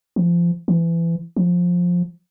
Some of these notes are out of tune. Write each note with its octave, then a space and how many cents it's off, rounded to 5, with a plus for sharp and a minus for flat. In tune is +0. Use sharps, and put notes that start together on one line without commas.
F3 -25
E3 +25
F3 +15